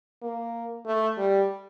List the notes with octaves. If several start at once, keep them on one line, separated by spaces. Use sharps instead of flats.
A#3
A3
G3